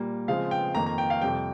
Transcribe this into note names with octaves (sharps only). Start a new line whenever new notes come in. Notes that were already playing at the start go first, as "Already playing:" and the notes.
Already playing: A#2 G3 A#3
C#3 F3 G#3 C4 F5
G5
F2 D#3 A#3 A#5
A#5
G5
F5
F2 C3 G3 G5